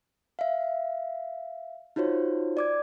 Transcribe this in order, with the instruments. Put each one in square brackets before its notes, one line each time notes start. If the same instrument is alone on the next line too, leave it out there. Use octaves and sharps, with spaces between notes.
[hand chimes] E5 F5
D#4 F4 F#4 C5 C#5
D5 D6 G#6